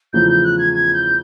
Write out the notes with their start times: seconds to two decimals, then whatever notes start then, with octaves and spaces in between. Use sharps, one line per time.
0.13 E2 C#3 F3 A3 G6
0.28 G6
0.44 F#6
0.59 G#6
0.73 G#6
0.94 G6